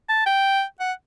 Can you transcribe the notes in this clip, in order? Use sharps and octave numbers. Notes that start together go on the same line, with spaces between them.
A5
G5
F#5